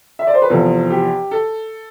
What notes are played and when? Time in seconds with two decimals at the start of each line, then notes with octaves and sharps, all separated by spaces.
0.19 E5
0.27 D5
0.34 C5
0.42 B4
0.50 E2 C3 F3 A4
0.90 G4
1.31 A4